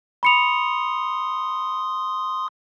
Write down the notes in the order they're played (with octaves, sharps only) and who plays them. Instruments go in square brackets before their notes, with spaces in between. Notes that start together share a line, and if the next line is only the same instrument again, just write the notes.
[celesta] B5 C#7 F7 [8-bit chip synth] C6 D#6